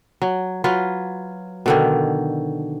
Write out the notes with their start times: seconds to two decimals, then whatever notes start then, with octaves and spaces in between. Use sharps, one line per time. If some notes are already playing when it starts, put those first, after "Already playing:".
0.22 F#3
0.64 F#3 F4 B4
1.66 B2 D3 D#3